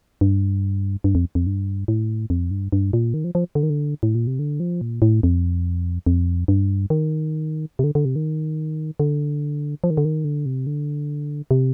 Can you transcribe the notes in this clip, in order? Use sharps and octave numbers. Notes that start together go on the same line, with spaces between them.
G2
G2
F2
F2
G2
A2
F2
G2
G2
A#2
D#3
F3
F3
D3
D#3
D3
A2
A#2
C3
D3
F3
A#2
A2
F2
F2
G2
D#3
C3
D3
D3
C3
D#3
D3
F3
D#3
D3
D#3
D3
C3
D3
C3